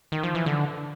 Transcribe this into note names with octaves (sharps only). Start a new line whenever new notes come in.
D#3
F3
E3
D3